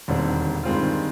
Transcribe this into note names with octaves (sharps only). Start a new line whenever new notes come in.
E1 D#2 D3 G3 C4
G2 D#3 G#3 C4 F4